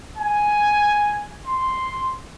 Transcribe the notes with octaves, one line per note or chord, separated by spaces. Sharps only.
G#5
C6